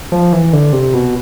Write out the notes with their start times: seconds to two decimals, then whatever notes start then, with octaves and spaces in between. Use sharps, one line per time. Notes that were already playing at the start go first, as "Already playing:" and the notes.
0.12 F3
0.33 E3
0.53 D3
0.73 C3
0.94 B2